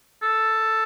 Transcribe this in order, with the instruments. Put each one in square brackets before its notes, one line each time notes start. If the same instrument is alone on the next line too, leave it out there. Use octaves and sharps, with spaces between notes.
[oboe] A4